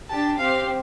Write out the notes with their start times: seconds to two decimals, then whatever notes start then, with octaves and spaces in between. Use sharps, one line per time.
0.09 D4 G4 A5
0.38 C4 G4 F5